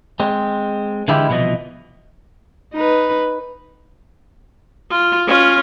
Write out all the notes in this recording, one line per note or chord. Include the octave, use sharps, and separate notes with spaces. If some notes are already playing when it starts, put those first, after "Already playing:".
G#3 C4
D3 E3 G#3 E4 F4 G4
C2 B2 E3 F3 D#5
D#4 B4
F4
C#4 F4